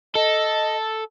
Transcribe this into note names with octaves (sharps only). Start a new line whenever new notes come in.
A4 D#5